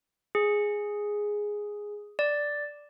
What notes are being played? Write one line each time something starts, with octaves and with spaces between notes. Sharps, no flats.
G#4
D5